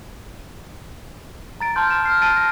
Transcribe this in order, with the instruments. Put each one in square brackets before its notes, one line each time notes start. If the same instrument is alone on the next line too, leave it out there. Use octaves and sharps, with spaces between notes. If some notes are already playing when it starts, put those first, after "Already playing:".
[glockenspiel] A#5 A6 D7
A5 C6 F6 G6
A5 E7
F6 C7
A5 A6 D7 D#7
A#6